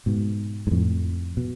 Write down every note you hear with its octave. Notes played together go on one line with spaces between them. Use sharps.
G#2 B2
G#2
F2 A2
B2